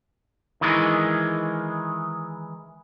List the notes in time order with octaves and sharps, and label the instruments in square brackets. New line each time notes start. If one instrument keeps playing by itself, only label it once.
[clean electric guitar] D#3 E3 G#3